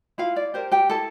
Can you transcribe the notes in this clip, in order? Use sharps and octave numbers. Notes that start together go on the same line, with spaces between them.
E4 F4 F5
D5
G4 A#4 C5
G4 G5
E4 A4 A5